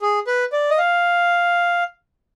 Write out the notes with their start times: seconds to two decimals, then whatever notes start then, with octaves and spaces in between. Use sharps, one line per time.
0.02 G#4
0.27 B4
0.53 D5
0.70 D#5
0.78 F5